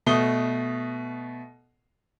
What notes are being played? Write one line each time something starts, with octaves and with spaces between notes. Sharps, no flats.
B2 A3 D#6 G7